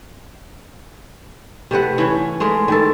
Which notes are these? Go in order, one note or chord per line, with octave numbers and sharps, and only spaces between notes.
C3 A3 B4 F#5
E3 C#4
G#3 A3 G#4 A#4
D#3 E3 A4